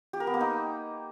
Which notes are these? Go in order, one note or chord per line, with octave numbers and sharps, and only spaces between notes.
G4
A#4
B3
A#3
D#4